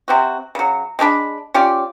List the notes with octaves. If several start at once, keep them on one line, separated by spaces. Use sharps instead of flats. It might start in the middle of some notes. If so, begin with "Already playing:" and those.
C3 C4 F#4
C#3 F#3
G#3 A3 D4 B5
C#4 F4 G4 D5